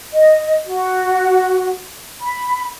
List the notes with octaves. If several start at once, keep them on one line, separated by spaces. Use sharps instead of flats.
D#5
F#4
B5